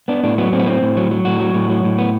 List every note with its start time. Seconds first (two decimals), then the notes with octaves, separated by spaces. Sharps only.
0.08 B3 D4
0.24 A2 D4
0.38 F#3 B3
0.52 A2 C4
0.59 B3
0.67 A2 C4
0.82 A2
0.97 F#3
1.11 F#3
1.25 A2 F#4
1.40 F#3
1.54 A2
1.70 F#3
1.85 A2
1.98 B3